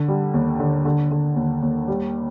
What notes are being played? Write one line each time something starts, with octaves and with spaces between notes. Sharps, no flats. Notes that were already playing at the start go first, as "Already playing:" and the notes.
Already playing: D3
G3
D#2
D3
D3
D3
D#2
D#2
G3